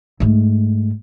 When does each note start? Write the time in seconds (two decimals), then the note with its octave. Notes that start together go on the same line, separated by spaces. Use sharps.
0.20 G#2 A3